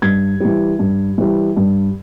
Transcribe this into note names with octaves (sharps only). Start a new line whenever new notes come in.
G2 G#6
E3 G3
G2
E3 G3
G2